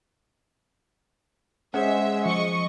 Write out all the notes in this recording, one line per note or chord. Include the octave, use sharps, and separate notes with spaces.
G#3 C#4 G#4 C5 E5 F#5
F3 D#5 C#6 C#7